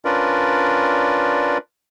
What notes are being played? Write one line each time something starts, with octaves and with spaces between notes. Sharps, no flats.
C#4 D4 F4 A#4 B4 D5